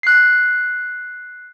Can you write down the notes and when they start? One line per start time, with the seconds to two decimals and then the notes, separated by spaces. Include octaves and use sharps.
0.03 F#6 C7